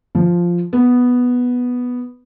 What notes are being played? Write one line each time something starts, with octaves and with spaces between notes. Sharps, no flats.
F3
B3